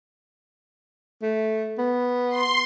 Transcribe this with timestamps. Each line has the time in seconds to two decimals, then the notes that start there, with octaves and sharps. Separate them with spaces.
1.22 A3
1.78 B3
2.29 C6